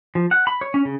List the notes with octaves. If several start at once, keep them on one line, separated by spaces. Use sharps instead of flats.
F3
F#5
B5
C#5
C#4
C#3